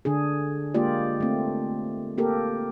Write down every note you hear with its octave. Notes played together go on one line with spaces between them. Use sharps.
D3 D4 G#4
G#3 A#3 F4 G4 D5
A3 C4
A#3 G4 A4 A#4